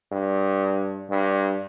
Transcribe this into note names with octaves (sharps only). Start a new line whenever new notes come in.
G2
G2